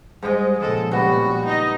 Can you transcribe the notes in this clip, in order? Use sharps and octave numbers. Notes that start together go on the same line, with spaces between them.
G#2 G3 G#3 G#4
A#2 C#3 F3 G#3 A4
G3 B3 F#4
D#4 D#5